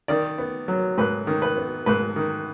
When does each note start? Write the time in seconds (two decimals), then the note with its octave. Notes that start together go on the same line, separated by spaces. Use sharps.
0.08 D#3 D5
0.38 B3
0.68 F#3
0.98 G#2 B4
1.27 D#3
1.42 B4
1.57 B3
1.86 G#2 B4
2.16 D#3